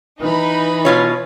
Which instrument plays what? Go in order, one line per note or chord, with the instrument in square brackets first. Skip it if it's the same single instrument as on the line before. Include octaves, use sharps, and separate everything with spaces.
[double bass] E3 [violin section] D#4 B5
[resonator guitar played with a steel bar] B2 F4 C#5